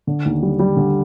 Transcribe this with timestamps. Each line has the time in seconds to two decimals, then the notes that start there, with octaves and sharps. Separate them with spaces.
0.07 D3
0.26 D#2
0.43 G3
0.59 G3
0.77 D3